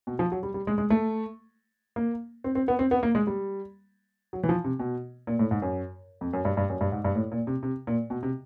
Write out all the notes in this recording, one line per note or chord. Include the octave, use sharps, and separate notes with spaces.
B2
F3
F#3
G3
G3
G#3
G#3
A3
A#3
C4
C4
B3
C4
B3
A#3
G#3
G3
F#3
E3
F3
C3
B2
A#2
A2
G#2
F#2
F2
F#2
G2
G2
F#2
G2
G#2
G2
A2
A#2
C3
C3
A#2
B2
C3